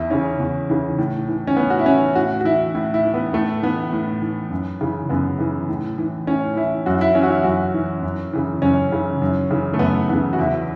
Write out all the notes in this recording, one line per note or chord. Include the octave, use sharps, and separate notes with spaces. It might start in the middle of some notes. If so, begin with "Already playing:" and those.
Already playing: E2 E4
C#3 E3 C#4
E2
C#3 E3
A2
E3
C#4
A2 B3
F#4
E4
E3 C#4
A2 F#4
F#4
E3 E4
A2 E4
E4
E3
B3
A2 A3
E3 B3
A2
E3
F#2
C#3 E3
F#2 B3
C#3 E3
A2
E3
A2 C#4
E3 E4
F#2 F#4
E4
E3 C#4
F#4
E4
F#2 F#4
E3
F#2
C#3 E3
F#2 C#4
C#3 E3
F#2
C#3 E3
A3
F#2 B3
C#3 E3 B3
F#4
E2 E4